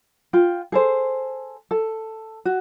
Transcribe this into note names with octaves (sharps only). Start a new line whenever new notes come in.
F4 G5
G#4 A4 C5
A4
F#4